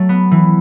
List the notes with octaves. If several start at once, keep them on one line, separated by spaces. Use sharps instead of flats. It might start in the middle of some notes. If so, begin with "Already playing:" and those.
Already playing: F#3 A3
B3
E3